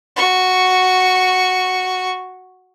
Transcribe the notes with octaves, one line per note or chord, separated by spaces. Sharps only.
F#4 C#6